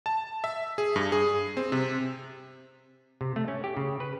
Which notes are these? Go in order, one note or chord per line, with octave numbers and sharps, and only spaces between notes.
A5
E5
G#4
G2
G#4
C4
C3
C3
A3
C#4
G4
C#3
B4